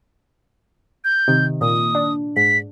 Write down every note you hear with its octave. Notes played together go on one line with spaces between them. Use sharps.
G6
C3 D#3
A#2 D#6
D4
G#2 B6